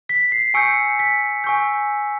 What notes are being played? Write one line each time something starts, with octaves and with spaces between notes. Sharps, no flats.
B6
C7
G#5 C#6 E6 G6 C#7
B6
G#5 C#6 E6 G6